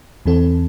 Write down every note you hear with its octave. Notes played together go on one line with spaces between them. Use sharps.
E2 E3 C4 A4